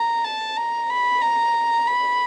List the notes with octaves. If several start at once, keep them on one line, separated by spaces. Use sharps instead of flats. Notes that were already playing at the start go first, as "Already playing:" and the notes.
Already playing: A#5
A5
A#5
B5
A#5
B5